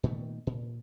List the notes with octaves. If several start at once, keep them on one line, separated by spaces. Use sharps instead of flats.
A#2 D#3 A3 B3
A#2